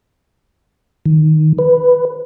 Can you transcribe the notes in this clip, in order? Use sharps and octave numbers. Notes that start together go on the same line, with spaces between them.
D#3
B4